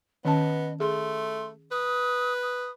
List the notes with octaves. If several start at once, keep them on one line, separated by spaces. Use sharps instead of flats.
D#3 B3 C#4 D#5 A5
A3 G#4 C6
B4 D#6
D#6